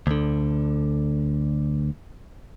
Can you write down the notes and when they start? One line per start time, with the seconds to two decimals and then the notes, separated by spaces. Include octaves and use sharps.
0.07 D2 D3